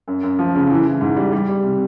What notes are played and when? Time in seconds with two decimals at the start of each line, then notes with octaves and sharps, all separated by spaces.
0.08 F#2
0.23 F#2
0.39 F3
0.55 C#3
0.70 E3
0.86 E3
1.01 G#2
1.16 G3
1.33 G3
1.48 G3
1.63 C3